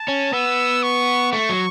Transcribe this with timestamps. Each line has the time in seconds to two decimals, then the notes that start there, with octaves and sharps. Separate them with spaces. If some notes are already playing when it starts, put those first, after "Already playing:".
Already playing: A5
0.08 C#4
0.33 B3 E6
0.83 C#6
1.32 A3 C#6
1.49 F#3